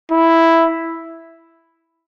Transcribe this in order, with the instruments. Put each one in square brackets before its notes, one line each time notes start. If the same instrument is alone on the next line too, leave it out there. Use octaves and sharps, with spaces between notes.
[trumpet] E4